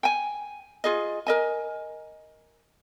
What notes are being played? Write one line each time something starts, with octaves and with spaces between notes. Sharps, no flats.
G5 G#5
F4 G#4 D#5
A#4 D#5 G#5